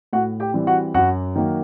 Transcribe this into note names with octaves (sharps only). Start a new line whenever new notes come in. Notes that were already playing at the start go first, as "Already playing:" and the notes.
A2 F#4 F#5
G4 G5
E3 G3 C4
F#4 F#5
F#2 F#4 F#5
D#3 F#3 A#3